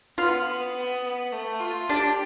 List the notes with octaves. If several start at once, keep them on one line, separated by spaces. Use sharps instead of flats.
B3 F4
B3
B3
B3
A3
F4
D4 G4